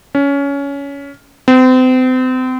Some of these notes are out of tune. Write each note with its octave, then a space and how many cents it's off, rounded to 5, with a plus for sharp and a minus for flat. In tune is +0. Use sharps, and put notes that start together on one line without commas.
C#4 +20
C4 -35